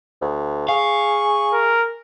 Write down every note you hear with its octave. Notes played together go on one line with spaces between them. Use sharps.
D2
G#4 F5 C#6
A#4